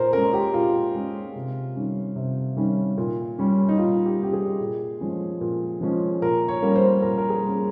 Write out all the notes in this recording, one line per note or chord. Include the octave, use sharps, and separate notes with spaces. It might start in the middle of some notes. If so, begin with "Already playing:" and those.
Already playing: A#2 A#4 C5
G#3 C#4 A#4
G4
A#2 F4
G#3 C#4
C3
D#3 G3 C#4
C3
D#3 G3 C#4
A#2
G3 C#4
D#4
A#2 F4
G4
G3 C#4 G4
G#4
A#2
F3 G#3 C#4
A#2
F3 G#3 C#4
A#2 A#4
C#5
G3 A#3 C#4
C5
A#2 A#4
A#4
G#4
G3 A#3 C#4